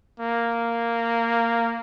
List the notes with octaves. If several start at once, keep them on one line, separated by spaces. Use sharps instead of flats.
A#3